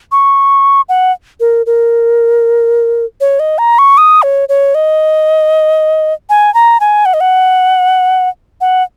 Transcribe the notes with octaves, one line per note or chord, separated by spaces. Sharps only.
C#6
F#5
A#4
A#4
C#5
D#5
A#5
C#6
D#6
C#5
C#5
D#5
G#5
A#5
G#5
F#5
D#5
F#5
F#5